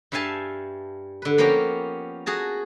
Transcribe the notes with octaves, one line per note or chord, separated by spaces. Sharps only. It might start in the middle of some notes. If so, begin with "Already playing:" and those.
G2 G3 E5 F5 G#5 A5
D3 B4
F3 A#3 B3 C#4 G4 A#4
F#4 G#4 A5 A#5